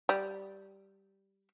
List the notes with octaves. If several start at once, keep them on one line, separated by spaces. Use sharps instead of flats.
G3